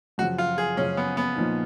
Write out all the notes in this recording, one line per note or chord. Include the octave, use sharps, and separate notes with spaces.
F#2 C#3 F3 F#4
F4
G#4
F#2 C#3 F3 C#4
B3
B3
A#2 F3 A#3 D#4